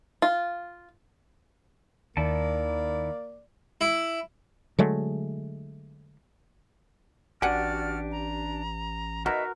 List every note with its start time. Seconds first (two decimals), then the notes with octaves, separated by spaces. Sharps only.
0.22 F4
2.17 D#2 D#3 A#3 E4 D5 A5
3.81 E4
4.79 D3 F#3 G#3 A3
7.42 A1 D4 F#4 G4 D5 F#5 G#5 F6
8.12 A#5
9.26 B2 D#4 F#4 A#4 E5